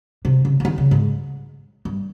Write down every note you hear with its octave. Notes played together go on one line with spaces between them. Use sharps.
C3
C#3
C#3
D#3
C#3
G#2
G2